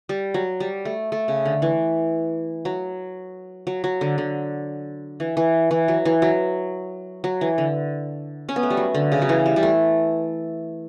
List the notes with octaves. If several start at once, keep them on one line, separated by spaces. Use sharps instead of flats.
G3
F#3
G3
A3
A3
C#3
D3
E3
F#3
F#3
F#3
D3
D3
E3
E3
E3
F#3
E3
F#3
F#3
E3
D3
C#4
B3
A3
G3
F#3
D3
C#3
F#3
E3
G3
G3
A3